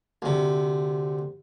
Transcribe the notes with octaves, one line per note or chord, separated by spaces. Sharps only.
D2 C3